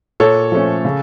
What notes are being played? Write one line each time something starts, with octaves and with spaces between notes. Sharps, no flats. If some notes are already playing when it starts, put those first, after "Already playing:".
A#2 A4 C#5
F3 A3 C#4
C#3